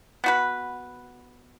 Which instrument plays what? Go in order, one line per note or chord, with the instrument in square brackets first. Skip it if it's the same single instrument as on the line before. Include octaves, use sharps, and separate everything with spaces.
[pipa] B3 F#4 B4